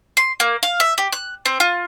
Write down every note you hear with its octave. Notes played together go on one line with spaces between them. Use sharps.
C6
A#3
F5
E5
G4
F#6
C4
F4